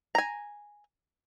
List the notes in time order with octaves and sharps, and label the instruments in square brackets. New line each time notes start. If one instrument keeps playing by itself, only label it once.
[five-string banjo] G#5 A#5